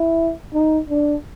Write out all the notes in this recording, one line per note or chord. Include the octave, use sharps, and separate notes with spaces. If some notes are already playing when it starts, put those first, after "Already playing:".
Already playing: E4
D#4
D4